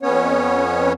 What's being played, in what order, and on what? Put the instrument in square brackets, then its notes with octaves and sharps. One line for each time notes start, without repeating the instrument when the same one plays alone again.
[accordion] F2 B3 C#4 C#5